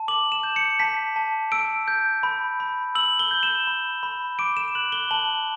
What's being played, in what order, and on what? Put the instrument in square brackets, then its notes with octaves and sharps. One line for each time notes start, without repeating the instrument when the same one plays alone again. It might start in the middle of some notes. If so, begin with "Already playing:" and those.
Already playing: [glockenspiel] A5
D6 F#7
E7
G6
C#7
A5 B6
A5
E6 D7
G6
B5
B5
E6 F#7
G7
G6
E7
B5
B5
D6 D7
E7
F#6 F#7
G7
A5 F#7